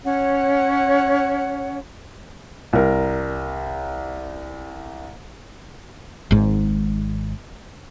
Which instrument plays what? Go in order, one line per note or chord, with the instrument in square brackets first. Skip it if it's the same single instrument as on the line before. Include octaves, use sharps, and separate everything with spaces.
[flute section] C#4 C#5 F#5
[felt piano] C2 A#4
[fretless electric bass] G#1 G#2